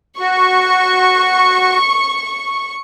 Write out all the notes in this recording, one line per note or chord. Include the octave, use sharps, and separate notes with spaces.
F#4 C#6